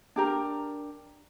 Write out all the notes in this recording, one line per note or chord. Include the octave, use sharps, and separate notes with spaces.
D4 G4 A#4